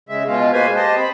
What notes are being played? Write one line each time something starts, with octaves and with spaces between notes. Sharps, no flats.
C#3 G#3 E5
B2 G#3 F4
G#3 A#3 B4 C5 G#5
G4 C5 D#5 A5
C4 B5